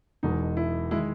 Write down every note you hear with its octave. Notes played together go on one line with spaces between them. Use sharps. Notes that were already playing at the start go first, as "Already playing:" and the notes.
E1 E2 B2 G#3 D#4
E4
D#3 G#3 E4